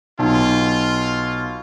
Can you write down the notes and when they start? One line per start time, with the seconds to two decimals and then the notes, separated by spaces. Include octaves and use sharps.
0.19 B1 F4